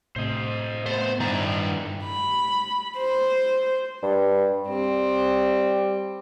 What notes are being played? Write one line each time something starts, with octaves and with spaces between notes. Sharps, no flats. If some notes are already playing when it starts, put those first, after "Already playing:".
A2 C3 C5 D#5
A3 B3 C5
G2 D#3 D4 E4 A#5
B5
C5
G2
G3 C4